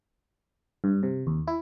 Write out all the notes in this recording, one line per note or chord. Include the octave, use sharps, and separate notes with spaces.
G2
C3
D#2
E4